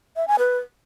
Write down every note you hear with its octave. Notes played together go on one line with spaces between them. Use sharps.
E5
G#5
B4